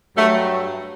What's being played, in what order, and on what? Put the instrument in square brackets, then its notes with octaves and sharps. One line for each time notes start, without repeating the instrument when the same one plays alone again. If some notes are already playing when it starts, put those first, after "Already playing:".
[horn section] G2 F#3 A3